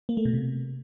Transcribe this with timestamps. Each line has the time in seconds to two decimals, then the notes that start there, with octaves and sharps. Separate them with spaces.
0.09 A#3
0.17 A3
0.25 B2
0.34 C3